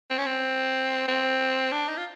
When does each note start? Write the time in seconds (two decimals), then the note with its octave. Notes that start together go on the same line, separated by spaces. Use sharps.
0.10 C4
0.18 C#4
0.26 C4
1.08 C4
1.72 D4
1.89 D#4
1.97 F4